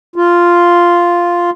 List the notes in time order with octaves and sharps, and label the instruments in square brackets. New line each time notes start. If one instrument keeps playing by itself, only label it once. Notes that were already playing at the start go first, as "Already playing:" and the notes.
[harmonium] F4